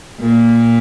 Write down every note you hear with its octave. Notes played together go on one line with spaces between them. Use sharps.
A#2